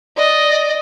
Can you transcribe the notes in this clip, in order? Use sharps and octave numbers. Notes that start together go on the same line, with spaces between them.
D5 D#5